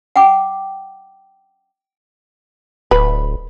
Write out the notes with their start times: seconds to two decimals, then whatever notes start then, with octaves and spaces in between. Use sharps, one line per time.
0.16 F#5 G5 D6
2.91 D1 B4